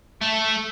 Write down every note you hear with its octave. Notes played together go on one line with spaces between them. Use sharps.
A3